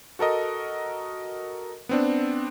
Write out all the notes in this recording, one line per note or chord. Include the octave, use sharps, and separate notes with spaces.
F#4 A4 A#4 D#5
B3 C4 D4